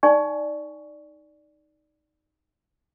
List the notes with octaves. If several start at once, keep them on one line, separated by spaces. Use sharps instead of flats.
D#4 D5 G#5 C#6